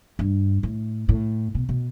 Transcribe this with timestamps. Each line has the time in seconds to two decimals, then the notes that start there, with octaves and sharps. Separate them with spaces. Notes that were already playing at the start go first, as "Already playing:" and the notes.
0.19 G2
0.63 A2
1.09 A2
1.55 B2
1.69 B2